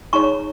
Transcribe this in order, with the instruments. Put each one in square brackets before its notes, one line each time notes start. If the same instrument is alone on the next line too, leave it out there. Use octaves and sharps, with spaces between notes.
[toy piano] D#4 G#4 C#5 A#5 C#6